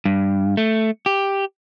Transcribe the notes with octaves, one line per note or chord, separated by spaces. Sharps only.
G2
A3
G4